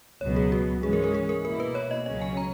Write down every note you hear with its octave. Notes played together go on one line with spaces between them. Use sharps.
C#2 B2 F#3 B3 C#5
G#4
F#4
G#2 E3 G#3 C#4 G#4
A#4
A#4
G#4
A#4
B2 A#3 E4 A#4
B4
C#5
D#5
C#2 C#3 F#3 C#4 D#5
G#5
A#5